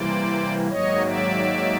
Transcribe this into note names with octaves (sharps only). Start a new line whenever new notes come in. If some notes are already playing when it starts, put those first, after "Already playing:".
Already playing: C3 E3 G3 A#3 C5 D5
G#2 D#3 F#3 A#3 C#5 D#5
D5 E5